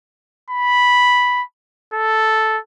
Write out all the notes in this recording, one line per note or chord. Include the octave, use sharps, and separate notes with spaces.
B5
A4